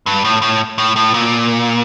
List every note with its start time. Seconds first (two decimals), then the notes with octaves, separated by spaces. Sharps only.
0.06 G2
0.24 A2
0.42 A2
0.78 A2
0.96 A2
1.14 A#2